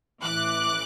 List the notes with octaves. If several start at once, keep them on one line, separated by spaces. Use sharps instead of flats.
A1 A2 E3 D6 F#6